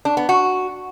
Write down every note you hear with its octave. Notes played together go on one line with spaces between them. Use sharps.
D4
B3
F#4